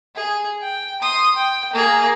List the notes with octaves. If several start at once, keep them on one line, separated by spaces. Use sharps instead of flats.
G#4
G5
C6 D#6
G5
A#3 G#4